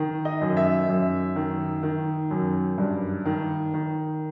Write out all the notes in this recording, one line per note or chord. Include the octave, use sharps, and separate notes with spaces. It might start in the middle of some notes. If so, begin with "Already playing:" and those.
Already playing: D#3
D#5
F#2
E5
F#2
D#3
D#3
F#2
G2
D#3
D#3